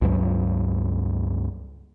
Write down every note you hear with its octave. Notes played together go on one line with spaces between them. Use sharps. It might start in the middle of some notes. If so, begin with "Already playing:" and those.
C#2 G2 F#3